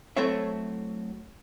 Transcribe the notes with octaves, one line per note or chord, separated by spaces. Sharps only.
F#3 A3 C4 E4 C#5 E5